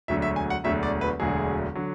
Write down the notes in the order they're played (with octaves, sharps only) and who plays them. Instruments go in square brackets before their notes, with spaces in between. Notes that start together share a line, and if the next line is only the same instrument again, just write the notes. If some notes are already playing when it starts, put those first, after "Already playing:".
[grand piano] E1 D2 D3 F#3 E5
E5
G#5
F#5
E1 D2 D3 F#3 E5
D5
B4
E1 D2 D3 F#3 G#4
D3 F#3